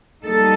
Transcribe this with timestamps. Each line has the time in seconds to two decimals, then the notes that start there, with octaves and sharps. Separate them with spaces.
0.24 G3 A#3 D#4 A4